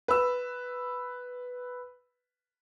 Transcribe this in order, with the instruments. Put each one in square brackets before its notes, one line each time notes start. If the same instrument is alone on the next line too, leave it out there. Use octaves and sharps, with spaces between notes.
[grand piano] B4 E6